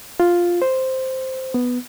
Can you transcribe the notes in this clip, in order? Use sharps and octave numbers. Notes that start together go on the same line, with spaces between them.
F4
C5
B3